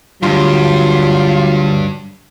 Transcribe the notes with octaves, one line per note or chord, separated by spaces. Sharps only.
D2 G2 F#3 G3 F4 C6